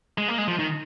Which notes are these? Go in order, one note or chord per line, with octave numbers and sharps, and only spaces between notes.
G#3
A#3
G#3
F3
D#3